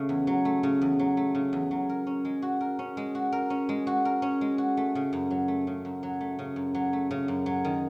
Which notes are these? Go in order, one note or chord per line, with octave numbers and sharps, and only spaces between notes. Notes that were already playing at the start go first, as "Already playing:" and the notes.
Already playing: C#3 A3
E2
F#3
A3
C#3
E2
F#3
A3
C#3
E2
F#3
A#4
C#4
G#3
F#4
A#4
C#4
G#3
F#4
A#4
C#4
G#3
F#4
A#4
C#4
G#3
F#4
A3
C#3
F#2
F#3
A3
C#3
F#2
F#3
A3
C#3
F#2
F#3
A3
C#3
F#2
F#3
D#3